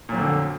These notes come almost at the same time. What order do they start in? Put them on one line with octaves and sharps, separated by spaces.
A#2 F#3 F2 D3